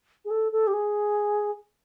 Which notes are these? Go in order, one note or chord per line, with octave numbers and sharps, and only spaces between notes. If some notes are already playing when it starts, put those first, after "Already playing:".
G#4
A4
A4
G4
G#4